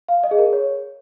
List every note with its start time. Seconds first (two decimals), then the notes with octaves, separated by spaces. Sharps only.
0.08 F5
0.24 D#5
0.31 G#4
0.38 A#4
0.53 C#5